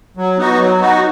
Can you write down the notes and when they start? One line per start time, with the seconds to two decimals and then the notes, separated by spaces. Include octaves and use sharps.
0.17 F#3
0.37 B3 D#4 F#4
0.60 F#3
0.79 B3 D#4 F#4